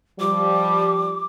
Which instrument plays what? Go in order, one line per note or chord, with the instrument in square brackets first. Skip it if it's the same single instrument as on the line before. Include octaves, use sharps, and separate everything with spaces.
[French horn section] F3 G3 [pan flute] D6